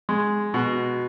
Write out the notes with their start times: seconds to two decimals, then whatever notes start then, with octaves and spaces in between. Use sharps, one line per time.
0.09 G#3
0.54 B2